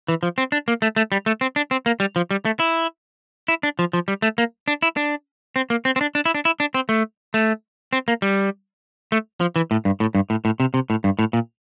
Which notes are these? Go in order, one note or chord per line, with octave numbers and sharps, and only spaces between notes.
E3
F3
C4
D4
A#3
A3
A3
G3
A3
C4
D4
C4
A#3
G3
F3
G3
A3
E4
E4
D4
F3
F3
G3
A3
A#3
D4
E4
D4
C4
A#3
C4
C4
D4
D4
E4
D4
E4
D4
C4
A3
A3
C4
A#3
G3
A3
F3
E3
A2
G2
A2
G2
A2
A2
C3
C3
A2
G2
A2
A#2